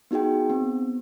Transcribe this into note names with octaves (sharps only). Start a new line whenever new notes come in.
B3 D#4 F#4 G#4 G5
B3 C4